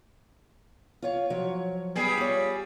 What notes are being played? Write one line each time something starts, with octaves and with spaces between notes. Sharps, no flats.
F4 C#5 F5
F3 F#3 C#5
G3 B3 G#4
F4 C#5